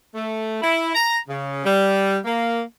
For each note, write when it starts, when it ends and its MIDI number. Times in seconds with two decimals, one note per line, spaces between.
0.15 0.59 57
0.62 0.90 64
0.95 1.17 82
1.29 1.62 49
1.65 2.19 55
2.25 2.62 58